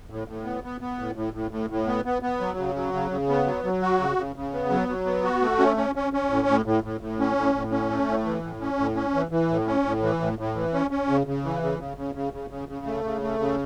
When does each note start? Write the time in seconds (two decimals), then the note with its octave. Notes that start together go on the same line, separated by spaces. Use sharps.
0.10 A2
0.28 A2
0.45 B3
0.64 B3
0.81 B3
0.99 A2
1.16 A2
1.34 A2
1.51 A2
1.70 A2
1.87 B3
2.05 B3
2.22 B3
2.40 F#3
2.58 C#3
2.76 F#3
2.93 C#3
3.11 C#3
3.28 B3
3.46 F#3
3.64 F#3
3.82 F#4
4.00 C#3
4.18 C#3
4.36 C#3
4.53 B3
4.70 F#3
4.88 F#3
5.06 B3
5.24 F#4
5.42 A3
5.59 C#4
5.77 C#4
5.95 C#4
6.13 C#4
6.30 A2
6.48 A2
6.66 A2
6.84 A2
7.01 A2
7.20 C#4
7.37 A2
7.55 A2
7.72 C#4
7.90 A3
8.08 A2
8.25 E3
8.43 A2
8.61 C#4
8.79 A2
8.96 C#4
9.14 E3
9.31 E3
9.50 A2
9.67 C#4
9.85 A2
10.03 E3
10.20 A2
10.39 A2
10.56 E3
10.73 C#4
10.91 C#4
11.09 C#3
11.27 C#3
11.45 E3
11.63 C#3
11.79 C#3
11.97 C#3
12.15 C#3
12.33 C#3
12.50 C#3
12.69 C#3
12.86 A3
13.04 C#3
13.22 A3
13.40 C#3